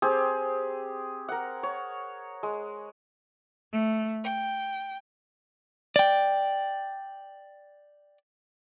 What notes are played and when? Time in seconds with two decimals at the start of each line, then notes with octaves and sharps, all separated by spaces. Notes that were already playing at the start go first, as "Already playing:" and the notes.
0.02 C4 G4 G#4
1.29 A#4 F#5
1.63 C#5
2.43 G#3
3.73 A3
4.22 G5
5.96 D5 G5